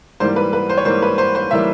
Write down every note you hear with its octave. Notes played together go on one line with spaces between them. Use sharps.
G#2 E3 G3 A#3 C5
B4
B4
C5
C#5
G#2 E3 G3 A#3 C5
B4
C5
C5
E3 G3 A#3 E5